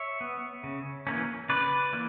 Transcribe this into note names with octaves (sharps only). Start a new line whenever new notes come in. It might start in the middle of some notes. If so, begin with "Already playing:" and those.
Already playing: C#5 E5
B3
C#3
E3 A#3 C#4
C#3 B4 D5
E3 A#3